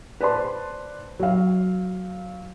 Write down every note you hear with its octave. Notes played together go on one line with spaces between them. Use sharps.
B4 C5 D5 A5 C6
F#3 F5